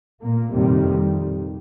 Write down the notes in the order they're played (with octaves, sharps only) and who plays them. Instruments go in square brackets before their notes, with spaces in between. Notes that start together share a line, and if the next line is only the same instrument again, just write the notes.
[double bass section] A#2 A#3
F2 C3 D#3 G3